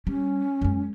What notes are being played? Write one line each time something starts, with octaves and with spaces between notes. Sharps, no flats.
G3 C#4
F#2 G#3